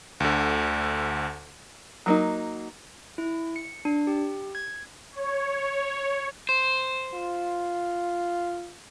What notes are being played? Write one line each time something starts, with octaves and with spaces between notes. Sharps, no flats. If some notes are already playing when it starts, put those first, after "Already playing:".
D2 D3
F#3 A#3 D#4
E4
C#7
D4
G4
G#6
C#5
C5
F4